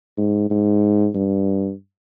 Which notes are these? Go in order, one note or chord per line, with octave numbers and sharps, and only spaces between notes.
G#2
G#2
G2